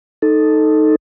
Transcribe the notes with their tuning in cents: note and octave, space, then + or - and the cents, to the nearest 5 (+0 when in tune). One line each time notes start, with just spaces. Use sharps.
D#4 +0 A4 +0